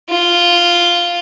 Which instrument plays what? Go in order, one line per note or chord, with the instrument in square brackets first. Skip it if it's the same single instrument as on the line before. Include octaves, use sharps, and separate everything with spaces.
[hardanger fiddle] F4